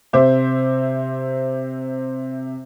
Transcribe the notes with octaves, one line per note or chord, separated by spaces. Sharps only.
C3 C5 E5 D6